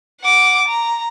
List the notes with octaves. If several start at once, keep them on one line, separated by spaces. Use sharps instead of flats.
F#5 D6
A#5